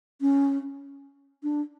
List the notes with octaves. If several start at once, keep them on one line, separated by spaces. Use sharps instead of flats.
C#4
D4